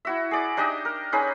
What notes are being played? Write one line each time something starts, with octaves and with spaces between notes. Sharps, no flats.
E4 F#4 E5
G#4 D5
D4 D#4 G4 D#5
A#4
C#4 D#4 G#4 B4